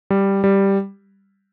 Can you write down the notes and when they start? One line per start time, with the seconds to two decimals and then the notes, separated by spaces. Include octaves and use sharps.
0.10 G3
0.44 G3